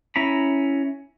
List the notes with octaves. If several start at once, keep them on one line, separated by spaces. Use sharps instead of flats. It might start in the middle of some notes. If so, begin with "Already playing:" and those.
C#4 E4 A#5 B5